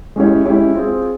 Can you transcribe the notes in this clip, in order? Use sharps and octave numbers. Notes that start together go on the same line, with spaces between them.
G#3 C#4 E4 G4 C#5
G#3 C#4 E4 G4 C#5
C4 F4 G#4